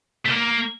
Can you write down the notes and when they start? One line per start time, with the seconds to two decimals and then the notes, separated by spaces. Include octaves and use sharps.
0.26 A3
0.31 A#3